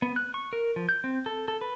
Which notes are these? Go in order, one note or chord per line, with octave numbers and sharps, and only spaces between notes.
B3
F#6
C#6
A#4
F3
G6
C4
A4
A4
B4